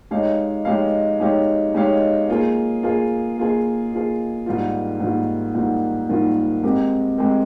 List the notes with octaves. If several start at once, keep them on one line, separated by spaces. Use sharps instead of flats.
G#3 D#4 G4 C#5 F5
G#3 D#4 G4 C#5 F5
G#3 D#4 G4 C#5 F5
G#3 D#4 G4 C#5 F5
A#3 F4 G#4
A#3 F4 G#4
A#3 F4 G#4
A#3 F4 G#4
G#2 D#3 G3 A#3 F4
G#2 D#3 G3 A#3 F4
G#2 D#3 G3 A#3 F4
G#2 D#3 G3 A#3 F4
G#3 C4 G4 A#4
G#3 C4 G4 A#4